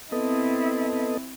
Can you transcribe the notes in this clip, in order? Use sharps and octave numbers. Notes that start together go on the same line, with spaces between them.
B3 C4 E4 A4 D#5